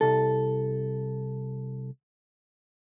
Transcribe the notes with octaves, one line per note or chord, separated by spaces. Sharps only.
C2 A4